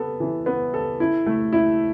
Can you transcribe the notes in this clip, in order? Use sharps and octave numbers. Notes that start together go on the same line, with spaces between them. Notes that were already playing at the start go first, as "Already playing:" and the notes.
Already playing: B3 A4
E3
B3
A4
E4
A3
E4